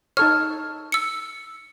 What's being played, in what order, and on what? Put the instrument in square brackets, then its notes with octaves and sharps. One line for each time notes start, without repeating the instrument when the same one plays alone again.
[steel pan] D#4 A4 C#5 [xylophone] F6
[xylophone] E6 C#7